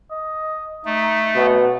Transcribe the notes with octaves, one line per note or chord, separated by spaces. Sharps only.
D#5
A3 D#4
B2 B3